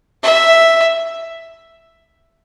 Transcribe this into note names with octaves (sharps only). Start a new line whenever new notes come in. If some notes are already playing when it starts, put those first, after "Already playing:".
E5